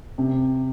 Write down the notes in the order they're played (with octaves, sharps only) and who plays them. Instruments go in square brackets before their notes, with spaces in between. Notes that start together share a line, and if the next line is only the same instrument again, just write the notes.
[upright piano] C3